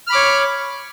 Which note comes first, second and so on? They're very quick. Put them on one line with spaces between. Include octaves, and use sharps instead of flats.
F6 B5 D6 C#5